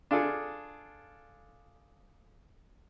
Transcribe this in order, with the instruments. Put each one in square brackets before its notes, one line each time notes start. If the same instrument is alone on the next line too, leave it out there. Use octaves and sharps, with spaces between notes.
[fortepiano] D4 F4 G#4 A4